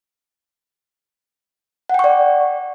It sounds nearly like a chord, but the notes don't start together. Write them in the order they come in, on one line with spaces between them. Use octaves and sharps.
F#5 G5 C#6 D5